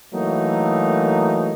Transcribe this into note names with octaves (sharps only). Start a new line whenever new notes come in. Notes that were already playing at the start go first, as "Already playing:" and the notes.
E3 F#3 A3 A#3 D#4